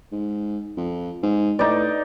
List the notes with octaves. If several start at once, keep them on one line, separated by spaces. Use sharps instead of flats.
G#2
F2
G#2
A2 D#4 D5